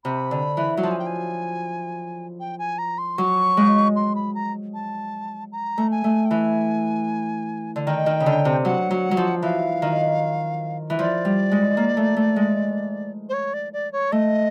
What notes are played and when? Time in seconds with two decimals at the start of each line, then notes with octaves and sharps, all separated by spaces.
0.04 C3 B5
0.31 D3
0.57 E3
0.77 F#3
0.83 F3 A5
0.91 G#5
0.99 G5
1.07 G#5
2.40 G5
2.59 G#5
2.78 A#5
2.98 C6
3.18 F#3 C#6
3.57 G#3
3.96 C6
4.15 B5
4.35 A#5
4.74 A5
5.52 A#5
5.78 A3
5.91 G#5
6.04 A3
6.26 G5
6.30 E3 G#5
7.76 D3
7.87 D#3 G5
8.06 D#3
8.20 C#3
8.26 D3
8.45 C3
8.65 F#3 F#5
8.91 F#3
9.11 F#3
9.17 F3
9.42 E3 F5
9.82 D#3
10.90 E3
10.99 F3 D5
11.25 G3
11.51 G#3
11.77 A#3
11.97 A3
12.16 A3
12.36 G#3
13.29 C5
13.33 C#5
13.54 D5
13.73 D5
13.93 C#5
14.12 A3 D#5